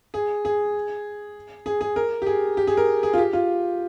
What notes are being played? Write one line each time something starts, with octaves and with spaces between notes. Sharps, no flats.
G#4
G#4
G#4
G#4
A#4
G4
G#4
G4
G#4
A#4
G#4
F4
G4
F4